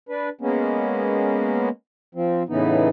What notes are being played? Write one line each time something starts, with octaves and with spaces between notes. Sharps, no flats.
D4 B4
G#3 A#3 B3 C#4
F3 C4
A2 C#3 E3 B3 D#4